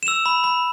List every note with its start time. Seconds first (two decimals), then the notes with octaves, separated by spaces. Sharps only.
0.03 E7
0.07 E6 F7
0.26 B5
0.44 B5